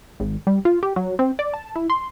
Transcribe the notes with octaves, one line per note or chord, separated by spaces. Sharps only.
G#1
G3
F4
G4
F#3
C4
D5
A5
E4
C6